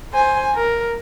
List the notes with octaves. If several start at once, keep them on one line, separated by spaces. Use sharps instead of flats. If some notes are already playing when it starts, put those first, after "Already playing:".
C5 G#5
A#4